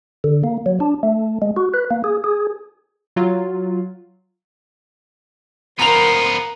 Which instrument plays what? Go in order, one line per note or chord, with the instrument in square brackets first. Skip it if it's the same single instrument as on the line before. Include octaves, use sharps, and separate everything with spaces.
[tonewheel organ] D3
A#3
F#3
D4
A3
G#3
F#4
B4
A#3
G#4
G#4
[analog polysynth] F#3 F4
[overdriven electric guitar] F3 B3 [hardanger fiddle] A#4 C6 [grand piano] A#5 F7